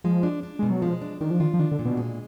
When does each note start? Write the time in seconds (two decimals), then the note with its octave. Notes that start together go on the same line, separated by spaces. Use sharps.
0.04 F3 G#3
0.23 D4
0.43 D4
0.59 B2 G#3
0.70 F#3
0.82 F3 G#3
1.02 D4
1.21 D#3 D4
1.31 F3
1.40 D#3 F4
1.54 F3
1.59 D#3 D4
1.72 D3
1.79 A#2
1.85 B2
1.97 G#3